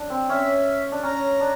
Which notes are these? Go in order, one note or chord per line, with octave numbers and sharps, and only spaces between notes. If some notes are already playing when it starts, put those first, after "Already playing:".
Already playing: D4
C4
C#4 E5
D4
C#4 A#5
D4